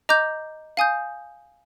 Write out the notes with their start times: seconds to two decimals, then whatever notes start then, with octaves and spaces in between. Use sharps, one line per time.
0.09 D#5 A#5 D6 G6
0.77 F5 G#5 D#6 G6